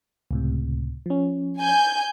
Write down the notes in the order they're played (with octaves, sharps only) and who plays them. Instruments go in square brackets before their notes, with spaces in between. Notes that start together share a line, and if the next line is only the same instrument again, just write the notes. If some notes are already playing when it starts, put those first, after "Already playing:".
[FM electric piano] C#2 A2 C3
F3 C#4
[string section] G#5 G6